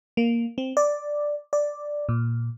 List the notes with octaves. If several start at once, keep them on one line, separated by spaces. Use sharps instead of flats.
A#3
C4
D5
D5
A#2